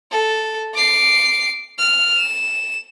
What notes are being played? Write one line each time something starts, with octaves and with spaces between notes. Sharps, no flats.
A4
D6 C7
F6
E7